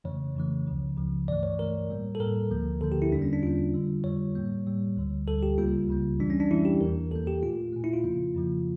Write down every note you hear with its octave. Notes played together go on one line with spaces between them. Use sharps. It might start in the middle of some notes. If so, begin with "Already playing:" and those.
F2 C#3 E3 A3 C#5
F2 C#3 E3 A3
C#2 C#3 F3
C#2 C#3 F3
G2 E3 A3 D5
C#5
G2 E3 A3 A#4
A2 G3 A#3
A4
A2 G3 A#3 A#4
D2 D3 F3 A#3
D2 D3 F3 A#3 A4
G4
E4
E2 D3 G3 A#3 D4
C#4
D4
E2 D3 G3 A#3 F4
F2 D3 G3
F2 D3 G3 C#5
A2 G3 A#3
A2 G3 A#3
D2 D3 G3
D2 D3 G3 A4
G4
C#2 C#3 G3 A#3 F4
C#2 C#3 G3 A#3
F2 E3 G3 D4
C#4
D4
F2 E3 G3 E4
G4
E2 E3 A#3 A#4
E2 E3 A#3 A4
G4
A#2 A3 F4
A#2 A3
E4
F4
F2 C#3 F3 A#3
F2 C#3 F3 A#3